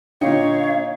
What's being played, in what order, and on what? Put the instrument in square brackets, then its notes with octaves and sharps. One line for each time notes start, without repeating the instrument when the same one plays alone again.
[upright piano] A#2 D3 [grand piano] D#4 G5 C#7 [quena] C#5 [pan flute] F5